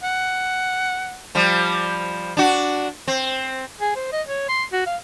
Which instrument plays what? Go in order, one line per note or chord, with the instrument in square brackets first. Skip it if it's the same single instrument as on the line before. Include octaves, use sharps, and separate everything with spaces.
[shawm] F#5
[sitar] F3 G3
D4 F#4
C4
[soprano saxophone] G#4
C5
D#5
C#5
C6
F#4
F5